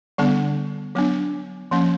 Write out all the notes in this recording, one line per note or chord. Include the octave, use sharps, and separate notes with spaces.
D3 G3 B3 D4 F#5
F#3 B3 D4
F3 A#3 C#4